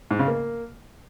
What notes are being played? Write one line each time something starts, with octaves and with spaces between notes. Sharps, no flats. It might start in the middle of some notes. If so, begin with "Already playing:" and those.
G#2
C#3
A#3